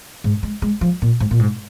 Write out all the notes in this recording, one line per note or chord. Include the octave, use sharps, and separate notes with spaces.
G#2
G#3
G#3
F3
A#2
G#2
A#2
G#2